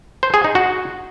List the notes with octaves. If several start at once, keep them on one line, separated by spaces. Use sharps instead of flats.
C5
G#4
D#4
F#4